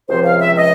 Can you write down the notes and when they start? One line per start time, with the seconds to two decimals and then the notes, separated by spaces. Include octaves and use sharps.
0.09 C#2 C3 F3 C5
0.25 F5
0.41 E5
0.56 D#5